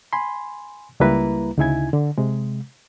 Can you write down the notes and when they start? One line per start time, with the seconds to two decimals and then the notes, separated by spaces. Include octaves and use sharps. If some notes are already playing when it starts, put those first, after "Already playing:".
0.13 G#5 B5 C6
1.00 C#2 G3 A#3 E4 B4 A#5
1.58 D2 C#3 D#4 E4 G#5 G#6
1.93 D3
2.18 C3 G#3